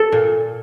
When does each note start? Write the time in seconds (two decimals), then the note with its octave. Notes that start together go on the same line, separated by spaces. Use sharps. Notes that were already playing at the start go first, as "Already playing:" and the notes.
Already playing: A4
0.12 A#2